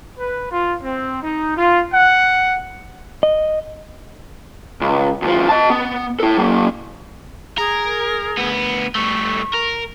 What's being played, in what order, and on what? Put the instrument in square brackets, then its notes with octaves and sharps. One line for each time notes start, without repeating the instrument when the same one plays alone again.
[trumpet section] B4
F4
C4
D#4
F4
F#5
[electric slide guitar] D#5
[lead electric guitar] C#2
D2 F3
D#5 A5
B3
E4 A4
F#3 A#3
[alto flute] G#4 [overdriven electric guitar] A#4
[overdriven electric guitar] D2 B3
[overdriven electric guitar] G3 A3 [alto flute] C#6
[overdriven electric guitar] A#4